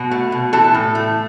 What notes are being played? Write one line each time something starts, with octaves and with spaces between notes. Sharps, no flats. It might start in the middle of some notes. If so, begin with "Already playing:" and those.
Already playing: B2 F#4
A3
B2
E3 A4
A2
A3